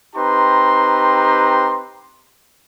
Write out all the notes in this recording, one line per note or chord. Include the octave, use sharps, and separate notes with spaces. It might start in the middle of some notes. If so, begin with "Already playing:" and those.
C4 D#4 G4 B4 A#5 C6